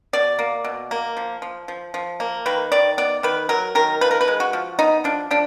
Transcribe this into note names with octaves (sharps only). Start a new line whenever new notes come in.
B2 D5
A#3
B2
A#3
F3
F3
F3
F3
A#3
D#3 B4
D#3 D5
B3 D5
D#3 B4
F#3 A#4
D#3 A#4
F3 B4
A#4
B4
G#3
F#4
F3
B3 D#4
F3 D4
F3 D4